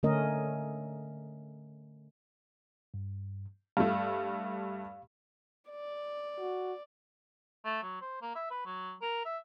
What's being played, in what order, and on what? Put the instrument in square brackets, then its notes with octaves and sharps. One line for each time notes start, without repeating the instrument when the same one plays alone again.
[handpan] D3 A3 C#4 A#4 D#5
[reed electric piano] G2
[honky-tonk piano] G2 A3 [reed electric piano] F5
[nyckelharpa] D5
[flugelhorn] F#4
[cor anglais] A3
F#3
C5
A#3
E5
B4
F#3
A#4
E5